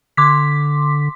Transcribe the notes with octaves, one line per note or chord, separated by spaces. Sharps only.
D3 C6 D6 B6